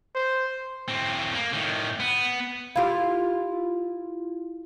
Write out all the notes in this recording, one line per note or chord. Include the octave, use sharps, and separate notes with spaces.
C5
A2 C4
A#3
A2 D#3
B3
E4 F4 G4 F5